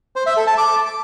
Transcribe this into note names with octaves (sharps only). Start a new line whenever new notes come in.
C5
E5
A4
A5
D6